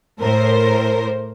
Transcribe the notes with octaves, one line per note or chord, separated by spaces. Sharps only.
A2 A#4 C5